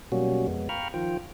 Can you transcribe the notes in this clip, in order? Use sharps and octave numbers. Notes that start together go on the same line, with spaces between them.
B2 F#3 G3 A#3 C#4 F#4
F2 G#3 B3
F5 G5 A#5 B5 C#6 F6
D#3 F3 F4 G5